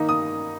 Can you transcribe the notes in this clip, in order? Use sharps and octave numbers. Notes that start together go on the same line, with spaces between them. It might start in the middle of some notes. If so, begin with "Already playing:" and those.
Already playing: D#3 A#3 D#4
D#6